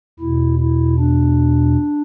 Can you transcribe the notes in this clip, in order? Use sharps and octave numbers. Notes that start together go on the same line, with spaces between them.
E2 B2 E4
E4
D4